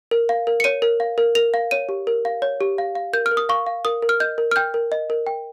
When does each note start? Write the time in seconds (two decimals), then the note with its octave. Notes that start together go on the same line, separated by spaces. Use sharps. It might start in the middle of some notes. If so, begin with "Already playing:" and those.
0.11 A#4
0.29 F5
0.47 A#4
0.60 C#7
0.64 C#5 D#7
0.82 A#4
1.00 F5
1.18 A#4
1.35 A#4 F7
1.54 F5
1.71 C#5 D#7
1.89 G4
2.07 A#4
2.25 F5
2.42 C#5
2.61 G4
2.78 F5
2.95 F5
3.13 A#4 G6
3.26 F6
3.31 A#4
3.37 D#6
3.49 F5 C#6
3.66 F5
3.85 A#4 D#6
4.02 A#4
4.09 F6
4.20 D#5 G6
4.38 A#4
4.51 F6
4.56 G5 G6
4.74 A#4
4.92 D#5
5.10 A#4
5.27 G5